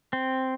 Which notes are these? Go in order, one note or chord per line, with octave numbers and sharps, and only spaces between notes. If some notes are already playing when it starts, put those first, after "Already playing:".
C4